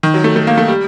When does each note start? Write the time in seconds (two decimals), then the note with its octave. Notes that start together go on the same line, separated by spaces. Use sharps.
0.03 D#3
0.14 F#3
0.24 A3
0.36 A3
0.47 A#3
0.58 A3
0.68 G3